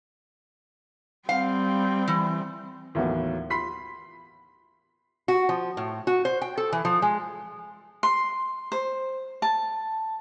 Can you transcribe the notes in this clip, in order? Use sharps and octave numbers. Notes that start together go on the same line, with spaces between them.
G3 C4 F5
E3
D#2 A2 E3 F#3 B3
B5 C6 B6 C7
F#4
F3
A2
F#4
C5
G5
A4
E3
F3
G#3
C6
C5
A5